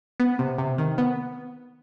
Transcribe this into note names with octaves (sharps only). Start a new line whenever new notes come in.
B3
C3
C3
D#3
B3